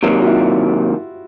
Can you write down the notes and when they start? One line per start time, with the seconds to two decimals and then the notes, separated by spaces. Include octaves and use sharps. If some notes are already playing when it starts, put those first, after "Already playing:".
0.03 C3 D#3 F#3 A#3
0.11 G4
0.22 F#4
0.26 E4
0.30 F4